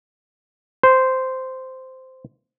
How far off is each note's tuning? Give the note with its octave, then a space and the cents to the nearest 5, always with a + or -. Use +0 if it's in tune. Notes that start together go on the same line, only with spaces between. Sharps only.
C5 -10